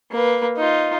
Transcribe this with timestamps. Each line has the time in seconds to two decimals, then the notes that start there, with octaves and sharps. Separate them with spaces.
0.11 A#3 B4
0.57 D#4 F4